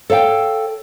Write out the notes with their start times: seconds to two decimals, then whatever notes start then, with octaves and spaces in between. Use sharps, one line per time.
0.10 A4 C#5 F5 G5